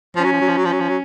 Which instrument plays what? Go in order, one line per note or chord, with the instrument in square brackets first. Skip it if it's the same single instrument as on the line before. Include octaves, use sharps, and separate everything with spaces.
[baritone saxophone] F3 [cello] C#4
[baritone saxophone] F#3
F3
F#3
F3
F#3
[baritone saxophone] F3 [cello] C#4
[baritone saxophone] F#3
F3
F#3